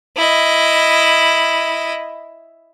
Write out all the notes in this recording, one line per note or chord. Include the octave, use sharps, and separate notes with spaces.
E4 D#5